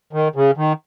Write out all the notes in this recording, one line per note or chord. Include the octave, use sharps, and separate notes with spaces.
D#3
C#3
D#3